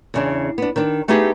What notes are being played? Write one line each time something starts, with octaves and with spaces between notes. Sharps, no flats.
E2 C#3 D4
B3 D4
D#3 D4
A3 B3 D#4 E4 G4 G#4